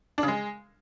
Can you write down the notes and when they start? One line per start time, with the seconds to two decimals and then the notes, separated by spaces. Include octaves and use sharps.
0.18 D4
0.23 C#3
0.28 G#3